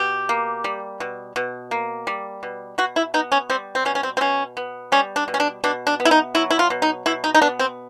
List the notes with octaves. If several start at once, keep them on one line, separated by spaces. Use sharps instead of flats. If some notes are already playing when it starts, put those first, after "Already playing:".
Already playing: B2 G4
A#3
G3
B2
B2
A#3
G3
B2
B2 F#4
E4
B3 D#4
C#4
G3 C4
C4
B2 C#4
C#4
C4
C4
B2 C#4
B3
G3 C#4
D4
B2
C#4
D4
B2 D4
D4
B3
E4
D#4
F#3 E4
E4
F4
B2
D#4
B2 E4
D#4
D#4
B3 D4
C4